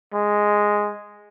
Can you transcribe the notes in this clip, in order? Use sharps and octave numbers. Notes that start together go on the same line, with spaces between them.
G#3